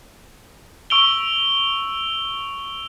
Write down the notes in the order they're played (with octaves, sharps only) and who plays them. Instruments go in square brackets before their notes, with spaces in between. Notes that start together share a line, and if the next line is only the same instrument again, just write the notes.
[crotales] C#6 E6 D7 F7 G7